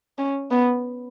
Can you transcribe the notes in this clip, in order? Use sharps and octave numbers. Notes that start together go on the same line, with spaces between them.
C#4
B3